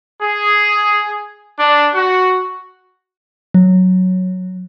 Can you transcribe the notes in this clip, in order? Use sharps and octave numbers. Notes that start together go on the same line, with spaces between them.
G#4
D4
F#4
F#3